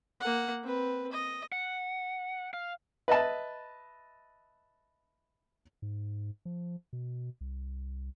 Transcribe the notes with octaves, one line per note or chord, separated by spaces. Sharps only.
A#3 F#5
C4 B4
D#5
F#5
F5
B4 D#5 E5 A5
G#2
F3
B2
C2